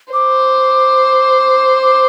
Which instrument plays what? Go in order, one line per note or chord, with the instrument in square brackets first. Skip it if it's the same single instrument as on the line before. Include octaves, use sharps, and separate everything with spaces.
[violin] C5 [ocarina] D6
[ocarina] D6